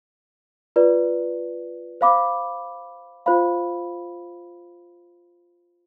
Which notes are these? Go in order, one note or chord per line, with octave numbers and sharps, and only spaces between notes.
F4 B4 D5
C5 F5 B5 D6
F4 C5 F5 B5